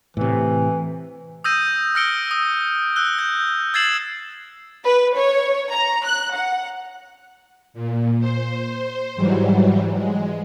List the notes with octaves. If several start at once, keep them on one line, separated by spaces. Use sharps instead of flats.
A2 C3 E3
D#6 E6 G6 A#6 D#7
E6 F6 A#6 C#7 D7 G7
D#6
E6 F#6 G7
G6
E6 G#6 A6 C7 E7 F#7
B4
C#5
A#5
F#6
F#5
A#2
C5
G#2 E3 F#3 G3
G#3